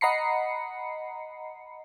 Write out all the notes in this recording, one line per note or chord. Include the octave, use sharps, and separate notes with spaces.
D#5 F#5 A#5 B5 C7 C#7